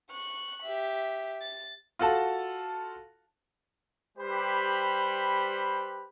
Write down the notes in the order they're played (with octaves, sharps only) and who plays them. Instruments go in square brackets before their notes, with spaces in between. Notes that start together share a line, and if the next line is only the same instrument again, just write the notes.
[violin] C#6 F#6
G4 E5
A6
[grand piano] F4 F#4 A4 A5
[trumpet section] G3 G4 B4 C5 B5